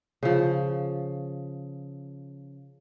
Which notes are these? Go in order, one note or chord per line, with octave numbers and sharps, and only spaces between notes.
C#3 F3